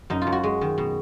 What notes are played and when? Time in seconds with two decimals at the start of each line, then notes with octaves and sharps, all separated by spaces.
0.10 F#2 D#4
0.21 F4
0.27 F#2
0.32 F#4
0.43 G#3
0.61 D#3
0.78 B2